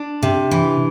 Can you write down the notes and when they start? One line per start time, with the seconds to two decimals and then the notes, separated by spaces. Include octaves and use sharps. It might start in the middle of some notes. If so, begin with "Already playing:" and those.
Already playing: D4
0.23 C3
0.51 E3